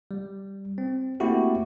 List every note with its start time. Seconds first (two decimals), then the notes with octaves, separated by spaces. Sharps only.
0.11 G3
0.78 C4
1.20 A3 A#3 C4 E4 F#4 G4